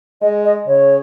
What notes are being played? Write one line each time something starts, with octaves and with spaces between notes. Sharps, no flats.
G#3 D#5
D#5
C#3 C#5